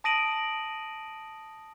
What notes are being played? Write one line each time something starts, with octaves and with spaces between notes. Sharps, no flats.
A5 D#6 A#6 D7 D#7 F#7